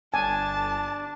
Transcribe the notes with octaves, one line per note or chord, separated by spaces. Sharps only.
G1 D4 G#5 A5